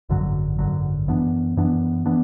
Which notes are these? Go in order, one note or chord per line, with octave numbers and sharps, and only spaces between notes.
G#1 F#2 D3 F#3
G#1 F#2 D3 F#3
F#2 E3 B3 D4
F#2 E3 B3 D4
E3 B3 D4